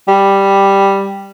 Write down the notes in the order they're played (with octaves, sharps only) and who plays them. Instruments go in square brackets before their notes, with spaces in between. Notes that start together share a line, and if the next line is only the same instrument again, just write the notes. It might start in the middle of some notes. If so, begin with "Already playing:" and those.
[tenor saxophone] G3